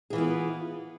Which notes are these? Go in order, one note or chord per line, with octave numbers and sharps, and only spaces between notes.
E3 B3 F4 G#4